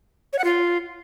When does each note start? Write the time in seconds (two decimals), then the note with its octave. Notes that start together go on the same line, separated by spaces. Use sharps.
0.33 C#5
0.39 F#5
0.44 F4